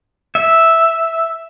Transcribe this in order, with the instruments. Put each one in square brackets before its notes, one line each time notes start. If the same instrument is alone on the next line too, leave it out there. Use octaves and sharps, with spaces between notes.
[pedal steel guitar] E5